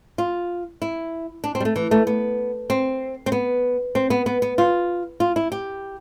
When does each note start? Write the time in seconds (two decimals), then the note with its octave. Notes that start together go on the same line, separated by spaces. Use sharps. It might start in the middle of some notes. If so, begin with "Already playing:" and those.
0.18 F4
0.82 E4
1.44 D4
1.55 C4
1.60 G3
1.65 A3
1.76 E3
1.91 A3
2.07 B3
2.70 C4
3.26 C4
3.32 B3
3.95 C4
4.10 B3
4.26 B3
4.42 B3
4.58 F4
5.20 F4
5.36 E4
5.52 G4